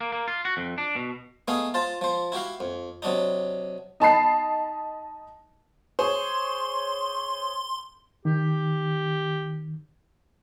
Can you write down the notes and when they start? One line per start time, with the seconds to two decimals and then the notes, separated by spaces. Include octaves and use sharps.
0.01 A#3
0.12 A#3
0.28 F4
0.45 F#4
0.57 F2
0.78 D4
0.96 B2
1.48 A3 B3 D#4 G#4 F5
1.74 F4 C5 A5
2.01 F3 C5
2.32 E4 F#4 G4 F5
2.60 F2
3.02 C3 F#3 D4 D#4
4.00 D#4 A5 B5 C7
5.99 G#4 C5 C#5 C6
8.25 D#3 G4